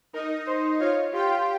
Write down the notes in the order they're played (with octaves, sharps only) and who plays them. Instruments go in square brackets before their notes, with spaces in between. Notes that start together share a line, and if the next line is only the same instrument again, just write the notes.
[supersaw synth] D#4 D#5 [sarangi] A#4
[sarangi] C5
[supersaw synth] F4 F5 [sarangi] C#5
[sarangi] F4 [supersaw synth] G4 G5